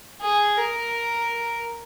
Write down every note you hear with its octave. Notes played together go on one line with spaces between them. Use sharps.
G#4
A#4